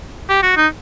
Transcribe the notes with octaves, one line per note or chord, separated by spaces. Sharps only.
G4
F#4
D#4